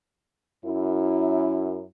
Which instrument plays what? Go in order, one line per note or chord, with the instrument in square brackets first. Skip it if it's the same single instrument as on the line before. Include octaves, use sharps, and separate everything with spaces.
[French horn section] F#2 E4